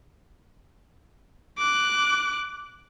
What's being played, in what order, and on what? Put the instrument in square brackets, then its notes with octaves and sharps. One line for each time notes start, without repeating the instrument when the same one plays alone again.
[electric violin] D6 F#6